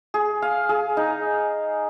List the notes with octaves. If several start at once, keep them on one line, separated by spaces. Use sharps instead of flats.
G#4
F5
G#4
D#4